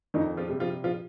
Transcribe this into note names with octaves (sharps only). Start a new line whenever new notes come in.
F2 D#3 D#4
F3 F4
C3 G3
F3 F4
F3 F4